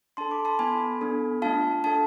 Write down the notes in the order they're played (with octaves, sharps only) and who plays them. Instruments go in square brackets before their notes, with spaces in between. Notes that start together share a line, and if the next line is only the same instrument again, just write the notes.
[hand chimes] D4 A4 A5 C6
B5 D6
A5 C6
B3 E4 A4 G#5 B5
B3 D4 A4
A3 D4 F4 F5 A5
D4 A4 F5 A5